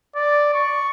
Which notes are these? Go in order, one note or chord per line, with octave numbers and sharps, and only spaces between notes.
D5
C#6